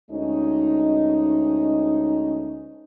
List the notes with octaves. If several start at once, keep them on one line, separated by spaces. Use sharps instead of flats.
D2 G#3 C#4 D#4